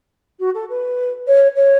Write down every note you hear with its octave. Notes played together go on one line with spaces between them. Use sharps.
F#4
A4
B4
C#5
C#5